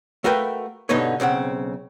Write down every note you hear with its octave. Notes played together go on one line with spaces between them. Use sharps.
A3 F#4 A#4 B4 F5 G5
G2 B2 D3 D#4 B4 C#5
B1 C#3 C4 F#5